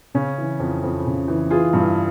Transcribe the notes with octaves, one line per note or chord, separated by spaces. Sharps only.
C#3 C#4
E3
F2
F2
C#3
E3
E3 F4 G#4
G2